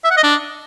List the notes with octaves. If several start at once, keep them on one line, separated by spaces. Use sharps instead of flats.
E5
F#5
D#5
D4